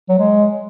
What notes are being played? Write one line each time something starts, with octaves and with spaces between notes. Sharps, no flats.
F#3
G#3